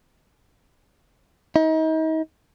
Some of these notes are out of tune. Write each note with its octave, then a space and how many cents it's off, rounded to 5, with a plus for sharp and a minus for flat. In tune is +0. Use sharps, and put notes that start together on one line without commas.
D#4 +35